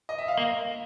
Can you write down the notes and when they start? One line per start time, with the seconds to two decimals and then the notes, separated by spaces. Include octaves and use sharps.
0.09 D#5
0.18 E5
0.28 F5
0.37 A#3